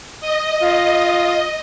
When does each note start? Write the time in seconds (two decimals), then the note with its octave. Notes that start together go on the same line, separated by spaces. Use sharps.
0.21 D#5
0.62 F4